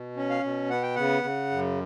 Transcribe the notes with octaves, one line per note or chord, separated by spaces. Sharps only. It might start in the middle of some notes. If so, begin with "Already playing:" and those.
Already playing: B2
C#4
F5
B2
B3 F#5
G5
C#3 F#5
C#3
F#2